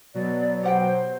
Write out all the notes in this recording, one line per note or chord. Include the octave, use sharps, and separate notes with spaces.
B2 F#3 D5
G4 C5 F#5 G5